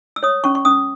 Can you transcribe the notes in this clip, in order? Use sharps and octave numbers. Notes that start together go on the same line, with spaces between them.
E6
C#5 D#6
C#4 C#6
C#6
C#4 D#6